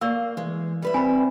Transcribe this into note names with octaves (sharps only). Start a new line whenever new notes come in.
A#3 D5 F5 C#6 E6
E3 G#3
G3 B4 E5
C4 G#5 B5